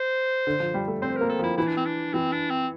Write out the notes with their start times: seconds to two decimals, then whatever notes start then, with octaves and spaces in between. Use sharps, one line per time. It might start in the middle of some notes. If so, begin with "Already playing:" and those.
Already playing: C5
0.47 D3
0.60 F3
0.74 G3
0.88 A3
1.02 C4 C5
1.16 A#3 A#4
1.29 A4
1.39 F3
1.44 E4
1.57 E3 E4
1.67 D4
1.77 C4
1.86 D4
2.14 E3 C4
2.32 D4
2.50 C4